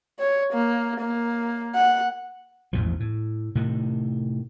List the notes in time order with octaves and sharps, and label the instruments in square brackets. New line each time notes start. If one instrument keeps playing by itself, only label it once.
[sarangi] C#5
A#3
A#3
F#5
[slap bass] A1 E2 G#2 F3
A2
A2 C3 D#3